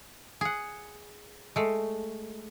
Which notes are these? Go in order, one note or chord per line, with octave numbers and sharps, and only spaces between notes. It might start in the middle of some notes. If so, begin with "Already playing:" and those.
G#4 F#5
G#3 A3